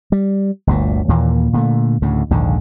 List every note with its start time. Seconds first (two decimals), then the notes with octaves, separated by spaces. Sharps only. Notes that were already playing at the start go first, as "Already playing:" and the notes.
0.12 G3
0.67 G1 D2 A#2
1.08 D#2 A#2 E3 A#3
1.53 A#2 D3 A3
2.02 D2 A2 C#3
2.31 A#1 D#2 G#2 D3